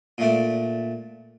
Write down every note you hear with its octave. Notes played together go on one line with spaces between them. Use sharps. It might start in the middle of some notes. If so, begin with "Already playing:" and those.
A#2 A3 D4